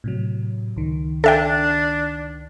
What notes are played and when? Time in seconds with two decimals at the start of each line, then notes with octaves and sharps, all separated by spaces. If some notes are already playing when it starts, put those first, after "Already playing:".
0.04 A2 C3 F#3
0.76 C#2 D#3
1.24 D4 A4 E5 G5